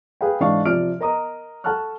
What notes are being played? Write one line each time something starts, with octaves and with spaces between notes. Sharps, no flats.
G#4 B4 F5 G5
G#2 E3 D4 D#5 F5 C#6
C3 F3 D5 F6 D7
A#4 D#5 A#5 D#6
A4 F#5 A5 C#6 F6 F#6